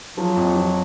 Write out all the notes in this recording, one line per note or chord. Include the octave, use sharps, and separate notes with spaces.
F3 F#3
F2
F3